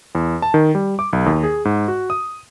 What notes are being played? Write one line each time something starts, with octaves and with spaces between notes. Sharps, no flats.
E2
A5
D#3
G3
D6
B1
D#2
G#4
G#2
F#4
D#6